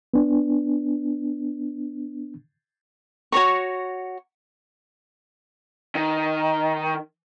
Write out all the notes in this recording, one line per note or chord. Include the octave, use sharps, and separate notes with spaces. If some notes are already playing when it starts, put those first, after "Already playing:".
B3 D4
F#4 C#5 A#5 C#6
D#3